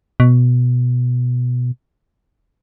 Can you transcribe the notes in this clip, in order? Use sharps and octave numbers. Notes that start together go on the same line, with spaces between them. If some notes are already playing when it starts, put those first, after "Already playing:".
B2